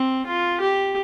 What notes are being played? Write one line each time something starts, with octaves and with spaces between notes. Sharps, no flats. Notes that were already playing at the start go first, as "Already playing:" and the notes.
Already playing: C4
F4
G4